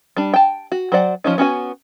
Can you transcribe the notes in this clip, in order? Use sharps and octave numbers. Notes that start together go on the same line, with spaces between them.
G3 D4
G5 A5
F#4
F#3 C5 D5 F#5
F3 C#4 D#4
B3 C#4 F#4 G#5